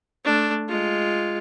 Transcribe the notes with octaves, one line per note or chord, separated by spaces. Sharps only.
A3 D4
G#3 F4